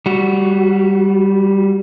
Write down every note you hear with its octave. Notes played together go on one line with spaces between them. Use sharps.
G3 F#4